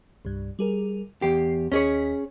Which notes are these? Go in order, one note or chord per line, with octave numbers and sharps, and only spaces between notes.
C2 G2
G3 G#4 A#4
E2 G4 C7
D#2 C#4 G#4 C#5 D#5 B6